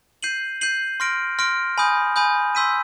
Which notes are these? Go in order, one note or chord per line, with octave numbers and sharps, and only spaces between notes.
G6 C7 D#7 F#7
G6 C7 D#7 F#7
C6 F6 A#6 D7
C6 F6 A#6 D7
G#5 B5 D#6 G6
G#5 B5 D#6 G6
C6 E6 G6 B6 D#7